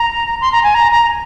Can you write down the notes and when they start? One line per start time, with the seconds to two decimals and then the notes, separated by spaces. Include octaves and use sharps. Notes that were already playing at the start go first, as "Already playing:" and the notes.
Already playing: A#5
0.41 C6
0.52 A#5
0.63 G#5
0.74 A#5
0.91 A#5